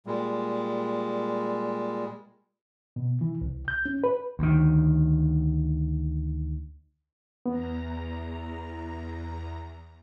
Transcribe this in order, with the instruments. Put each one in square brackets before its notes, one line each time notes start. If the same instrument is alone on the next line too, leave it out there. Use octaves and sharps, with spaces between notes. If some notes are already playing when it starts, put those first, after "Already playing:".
[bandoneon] A#2 G3 G#3
[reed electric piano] B2
E3
C2
G6
C#4
B4
[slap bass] D2 D#3
[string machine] E2 A#5 [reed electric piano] B3